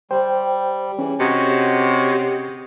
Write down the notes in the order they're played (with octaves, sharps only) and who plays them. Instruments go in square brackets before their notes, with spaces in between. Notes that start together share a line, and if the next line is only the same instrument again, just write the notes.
[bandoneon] G3 [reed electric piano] C5 G5
[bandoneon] E3 [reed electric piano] C#4 G#4
[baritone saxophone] C3 [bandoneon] F#4 C#5 D#5